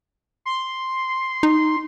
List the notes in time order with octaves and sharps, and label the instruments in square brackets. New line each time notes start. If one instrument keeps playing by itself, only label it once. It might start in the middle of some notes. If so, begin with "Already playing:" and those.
[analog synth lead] C6
[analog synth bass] D#4